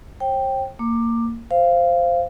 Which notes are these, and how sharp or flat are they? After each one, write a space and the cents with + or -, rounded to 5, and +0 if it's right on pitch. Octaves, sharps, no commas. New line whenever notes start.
C5 +45 G5 +0
A#3 -15 D6 +15
C5 +0 F5 -15